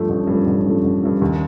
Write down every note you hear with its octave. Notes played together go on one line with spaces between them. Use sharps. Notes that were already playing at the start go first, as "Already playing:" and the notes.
Already playing: G2 F3 A3
A1
G2 F3 A3
A1
G2 F3 A3
A1
G2 F3 A3
D#2